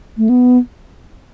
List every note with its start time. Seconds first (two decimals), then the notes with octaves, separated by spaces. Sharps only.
0.18 A3
0.29 B3